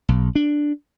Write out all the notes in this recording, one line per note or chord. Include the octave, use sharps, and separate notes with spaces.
B1
D4